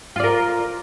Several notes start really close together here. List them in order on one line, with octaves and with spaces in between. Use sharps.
F4 D5 A#4